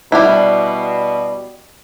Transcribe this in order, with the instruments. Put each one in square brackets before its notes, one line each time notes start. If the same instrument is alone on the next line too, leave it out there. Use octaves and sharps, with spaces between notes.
[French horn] B2 [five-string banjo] G3 D4 E4